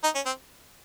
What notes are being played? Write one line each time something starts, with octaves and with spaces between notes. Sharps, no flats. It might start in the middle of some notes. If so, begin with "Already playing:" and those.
D#4
C#4
C4